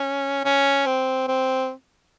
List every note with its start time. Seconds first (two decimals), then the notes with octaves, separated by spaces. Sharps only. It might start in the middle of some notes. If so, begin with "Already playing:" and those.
Already playing: C#4
0.44 C#4
0.86 C4
1.28 C4